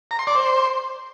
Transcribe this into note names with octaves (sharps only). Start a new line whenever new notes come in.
A#5
C6
D5
C5